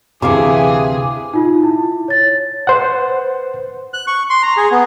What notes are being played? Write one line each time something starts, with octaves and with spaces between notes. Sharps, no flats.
D2 C3 E3 G#4 F5 D6
D#4 F4
E4
C#5 A6
B4 C5 F#5
F#6
C#6
C6
A#5
G#4
B3